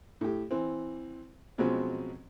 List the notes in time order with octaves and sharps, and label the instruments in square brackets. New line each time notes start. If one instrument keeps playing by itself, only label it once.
[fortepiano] A2 G4
E3 C4
B2 F3 F#3 G#3 C4 C#4